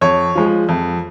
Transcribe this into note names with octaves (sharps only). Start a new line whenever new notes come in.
F2 C#5
F3 G#3
F2